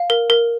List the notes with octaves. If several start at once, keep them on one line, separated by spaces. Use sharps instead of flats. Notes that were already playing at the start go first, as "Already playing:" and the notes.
Already playing: F5
A#4
A#4